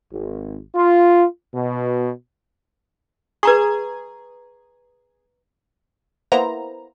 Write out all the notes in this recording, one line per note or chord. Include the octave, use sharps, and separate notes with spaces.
G#1
F4
B2
G#4 B4 A#5 C#6 G#6
A#3 B3 E4 C5 A#5